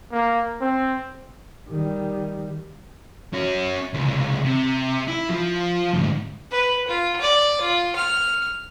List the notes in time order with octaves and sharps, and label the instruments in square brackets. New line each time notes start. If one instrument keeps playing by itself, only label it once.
[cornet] A#3
C4
[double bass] D#3 G3
[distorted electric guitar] C#4 F#4
C#2 C3
C3
E4
F3
D2 G#2
[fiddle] B4
F4
D5
F4
F6